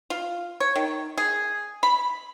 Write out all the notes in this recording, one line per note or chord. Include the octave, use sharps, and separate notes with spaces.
F4
C#5
D#3
G#4
B5